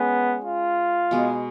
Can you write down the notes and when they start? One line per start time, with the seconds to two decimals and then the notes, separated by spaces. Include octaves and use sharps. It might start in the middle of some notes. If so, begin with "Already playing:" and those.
Already playing: G#3 B3 C#4 G#4 B4
0.44 F4
1.11 B2 G#3 B3